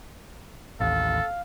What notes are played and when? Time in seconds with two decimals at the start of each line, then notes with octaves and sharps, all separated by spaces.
0.80 A1 D#2 A4 F5